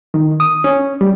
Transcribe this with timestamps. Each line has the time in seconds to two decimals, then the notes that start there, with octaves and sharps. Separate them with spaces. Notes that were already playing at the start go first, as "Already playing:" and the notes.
0.14 D#3
0.40 D#6
0.64 C#4
1.01 G3